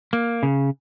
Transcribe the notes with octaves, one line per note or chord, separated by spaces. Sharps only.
A#3
C#3